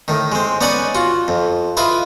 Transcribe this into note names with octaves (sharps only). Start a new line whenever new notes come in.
A2 D#3
G#3 C4
B3 C#4 D#4 D5 F#5 G#5
F4 F#4
F2
E4 F4 B4 D#5